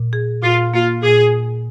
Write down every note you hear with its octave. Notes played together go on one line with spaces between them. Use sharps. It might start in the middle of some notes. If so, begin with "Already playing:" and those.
Already playing: A#2
G#4
A#2 F4
A#3 F4
A#2 G#4